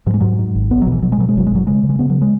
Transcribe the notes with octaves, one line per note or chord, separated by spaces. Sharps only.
G#2 F#3
G#3
G#2 F#3
G#2
G#1
B1 B3
F#3
B2
E3
B2 F#3
G#3
B2 F#3
G#3
F#1 F#3
G#3
F#1 F#3
C#3 G#3
C#3
G#3
C#3 B3
F#3
G#3